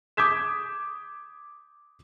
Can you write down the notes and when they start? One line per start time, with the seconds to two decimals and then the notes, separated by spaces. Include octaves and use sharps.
0.17 D6 D#6 G6 G#6 B6 E7